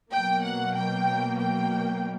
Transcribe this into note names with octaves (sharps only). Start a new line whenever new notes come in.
B2 F#3 A#3 G5
F#5
G5
G5